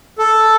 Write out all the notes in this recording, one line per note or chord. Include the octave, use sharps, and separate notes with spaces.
A4